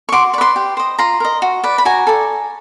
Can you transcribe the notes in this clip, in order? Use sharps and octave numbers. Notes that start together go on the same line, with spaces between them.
C#6
F#4 C6 D6
B4 D5 C6 C#6 D6
G4
C5 D#5
F4 A#5 C6
A#4 D#5
F#4
B4 D5
B5
F#4 G#5 A#5
A4 D5